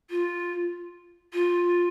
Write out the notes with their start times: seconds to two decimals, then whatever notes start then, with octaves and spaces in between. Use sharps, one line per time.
0.10 F4
1.33 F4